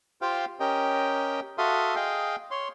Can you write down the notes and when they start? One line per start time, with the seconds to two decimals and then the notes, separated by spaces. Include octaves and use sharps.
0.22 F4 G4 C5 F5 G5
0.60 C#4 G4 A#4 D#5 G5
1.58 F#4 A4 E5 F5 C6 D#6
1.95 G#4 D#5 F5 G5
2.51 C#5 C6